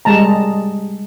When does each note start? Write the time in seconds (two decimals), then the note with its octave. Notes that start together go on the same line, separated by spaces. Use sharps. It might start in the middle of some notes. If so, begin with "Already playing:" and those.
0.05 G3 G#3 A5 A#5